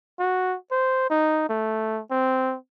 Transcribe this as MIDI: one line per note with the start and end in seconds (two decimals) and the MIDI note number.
0.19 0.56 66
0.71 1.09 72
1.10 1.46 63
1.49 2.01 57
2.11 2.56 60